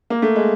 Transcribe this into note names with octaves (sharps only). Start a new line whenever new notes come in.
A#3
A3
G#3